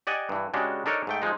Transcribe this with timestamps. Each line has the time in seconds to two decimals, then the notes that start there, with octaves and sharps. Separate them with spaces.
0.07 G4 D5 D#5 F#5 G#5
0.29 G2 E3
0.54 C#3 G#3 D4 F#4 G4
0.86 D4 D#4 A4 A#4 C#5
1.07 G#2 A3 G5
1.22 F3 G#3 D#4